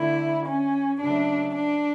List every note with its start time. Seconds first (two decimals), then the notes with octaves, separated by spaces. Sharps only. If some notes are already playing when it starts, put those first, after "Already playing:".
Already playing: D3 A3 E4
0.45 C#4
1.00 C#3 F#3 A3 D4
1.54 D4